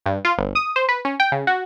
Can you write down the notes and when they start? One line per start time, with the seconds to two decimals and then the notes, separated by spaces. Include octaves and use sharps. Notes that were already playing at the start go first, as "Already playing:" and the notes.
0.06 G2
0.25 F4
0.38 G1
0.55 D#6
0.76 C5
0.89 B4
1.05 C#4
1.20 G5
1.32 C#3
1.47 F#4